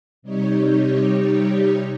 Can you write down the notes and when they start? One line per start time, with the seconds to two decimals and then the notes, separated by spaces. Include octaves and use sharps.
0.22 C3 G3 D#4 G4 C#5